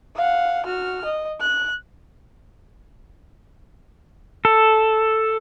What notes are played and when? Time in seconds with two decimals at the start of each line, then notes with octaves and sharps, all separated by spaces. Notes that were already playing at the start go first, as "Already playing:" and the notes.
0.16 F5 F#5
0.66 F#4 F6
1.05 D#5
1.41 F#6
4.45 A4